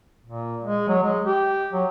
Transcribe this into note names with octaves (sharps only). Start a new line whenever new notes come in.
A#2
G#3
F#3
G#3
G4
F#3